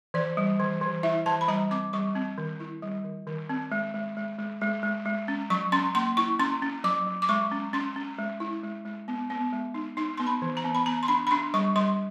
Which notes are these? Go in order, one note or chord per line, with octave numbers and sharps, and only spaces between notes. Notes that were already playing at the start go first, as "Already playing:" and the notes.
E3 D5
G3
E3
E3
E4 E5
E3 A5
B5
G3 A#5
C4 D6
G3 C#6
C4
D#3
E4
G3
D#3
D#3
C4
G#3
G#3
G#3
G#3
G#3
G#3
G#3
C#4
F#3 C#6
C#4 C6
A#3 C6
E4 C#6
C#4 C6
C#4
F#3 D6
F#3
D6
G#3 C#6
C#4
C#4 C6
C#4
G#3
E4
G#3
G#3
B3
B3
G#3
D#4
D#4 C6
B3 C6
B5
E3
A#5
B3
B5
B3 A#5
C6
D4 B5
B5
D4 C6
G3 C#6
G3 C6